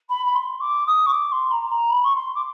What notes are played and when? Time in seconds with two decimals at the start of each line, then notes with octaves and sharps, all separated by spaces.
0.09 B5
0.25 B5
0.35 C6
0.60 D6
0.87 D#6
1.06 C#6
1.12 D6
1.32 C6
1.51 A#5
1.70 A#5
1.89 B5
2.04 C#6
2.15 C6
2.34 D6